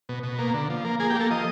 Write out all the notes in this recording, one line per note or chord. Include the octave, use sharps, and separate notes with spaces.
B2
B2
A#3
D3
F3
A#3
A#3 G#4
G4
A#3 A4
F3 D#5